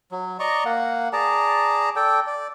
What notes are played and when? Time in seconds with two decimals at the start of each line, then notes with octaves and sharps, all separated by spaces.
0.12 F#3
0.40 D5 D#5 A#5 C#6
0.65 A#3 F#5
1.13 G#4 D5 A5 A#5
1.96 A4 D5 G5
2.27 D5